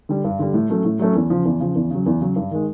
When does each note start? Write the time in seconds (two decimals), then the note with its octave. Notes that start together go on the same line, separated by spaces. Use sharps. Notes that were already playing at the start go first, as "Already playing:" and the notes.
0.09 D3 G3
0.24 G2
0.39 D3 G3
0.54 A2
0.70 F#3 A3 C#4
0.85 A2
0.99 F#3 A3 C#4
1.15 E2
1.30 C#3 F3
1.45 E2
1.60 C#3 F3
1.75 E2
1.90 C#3 F#3
2.06 E2
2.21 C#3 F#3
2.36 G2
2.51 D#3 G#3